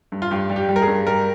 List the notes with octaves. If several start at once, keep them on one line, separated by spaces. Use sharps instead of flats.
G2
F4
G2 G4
G3
G4
G3
A#4
G#4
G2
G3 A#4